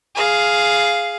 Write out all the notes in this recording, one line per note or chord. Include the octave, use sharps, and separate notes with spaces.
G#4 F5